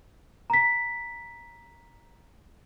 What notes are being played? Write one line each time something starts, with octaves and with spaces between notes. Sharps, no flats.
A#5 B6